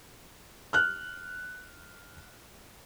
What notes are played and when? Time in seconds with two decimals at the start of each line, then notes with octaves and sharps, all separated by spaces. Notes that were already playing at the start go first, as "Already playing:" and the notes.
0.73 F6 F#6